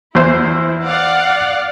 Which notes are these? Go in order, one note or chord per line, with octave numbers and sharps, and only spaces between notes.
E2 E4 C5
D5 F5 F#5